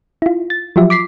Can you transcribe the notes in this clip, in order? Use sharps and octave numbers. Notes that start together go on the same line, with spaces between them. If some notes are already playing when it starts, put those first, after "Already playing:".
E4 F4
A6
F3 F#3 F4 G4 E5
D6 B6 C7